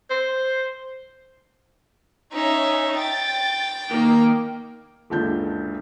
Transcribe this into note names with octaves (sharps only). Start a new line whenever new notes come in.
C5
C#4 D#4 E5
G5 A6
D#3 A#3
F#1 C#2 D3 A5 G6